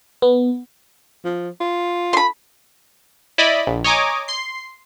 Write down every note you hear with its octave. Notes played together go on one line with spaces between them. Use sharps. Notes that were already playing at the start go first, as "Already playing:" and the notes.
B3
F3
F4
B5 C6
E4 D5 D#5 B5
A#1
C#5 D#5 G#5 A#5 D6
C6 C7